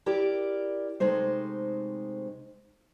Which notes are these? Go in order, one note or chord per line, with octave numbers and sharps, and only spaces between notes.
E4 G4 A#4 D5
C3 G#3 A3 D#4 C5